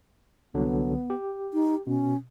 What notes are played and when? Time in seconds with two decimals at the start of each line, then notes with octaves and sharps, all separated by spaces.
0.54 C2 D3 F#3 B3
1.10 G4
1.54 D#4
1.87 B2 C#4